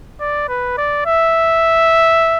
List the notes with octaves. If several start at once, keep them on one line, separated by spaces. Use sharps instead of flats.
D5
B4
D5
E5